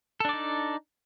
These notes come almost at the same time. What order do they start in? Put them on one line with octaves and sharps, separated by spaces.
A4 D4 D5 D#4